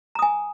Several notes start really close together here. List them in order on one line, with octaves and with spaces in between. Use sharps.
A#5 D#6 G#5